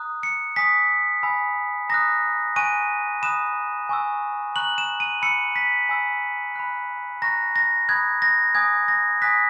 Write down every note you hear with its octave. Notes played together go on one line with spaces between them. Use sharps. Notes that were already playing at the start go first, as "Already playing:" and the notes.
Already playing: A#5 D#6 F#6
C#7
G#5 D#6 F#6 B6
G#5 B5 E6
A#5 D#6 F#6 A#6
G#5 C#6 F#6 D#7
B5 D#6 F#6 E7
G#5 C#6 E6
A#5 C#6 F#6 F#7
E7
D#7
B5 E6 C#7
B6
G#5 B5 E6
B5 F#6
A#5 C#6 F#6 A#6
A#6
B5 D#6 F#6 G#6
A#6
G#5 D#6 F#6 G#6
A#6
G#5 D#6 F#6 B6